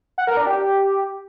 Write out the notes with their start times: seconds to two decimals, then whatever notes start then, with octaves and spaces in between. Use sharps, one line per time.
0.18 F#5
0.27 A#4
0.37 D4
0.47 G4